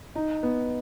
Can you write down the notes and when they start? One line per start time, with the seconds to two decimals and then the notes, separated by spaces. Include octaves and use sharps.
0.15 D#4
0.43 B3